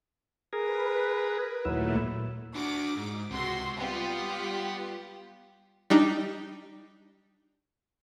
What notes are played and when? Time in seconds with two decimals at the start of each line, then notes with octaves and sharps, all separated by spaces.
0.53 G#4 A#4 B4
1.65 D#2 A#2 F#3 A3 E4
2.55 D4 F#4 D6
2.96 G#2
3.31 C#2 C3 F#4 C6
3.80 G3 B3 F4 G4
5.90 G3 D4 D#4